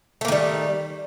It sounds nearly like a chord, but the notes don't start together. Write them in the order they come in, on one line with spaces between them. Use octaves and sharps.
A3 A#3 D#3 G3